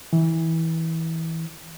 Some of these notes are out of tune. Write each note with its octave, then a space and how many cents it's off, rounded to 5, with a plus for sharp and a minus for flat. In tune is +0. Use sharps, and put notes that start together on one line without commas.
E3 -20